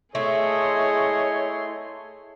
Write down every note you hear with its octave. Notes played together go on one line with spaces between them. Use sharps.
A3 E4 G#4 C#5 D#5 C6